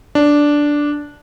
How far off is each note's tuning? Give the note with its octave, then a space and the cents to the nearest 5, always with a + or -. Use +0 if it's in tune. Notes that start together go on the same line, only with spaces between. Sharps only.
D4 -5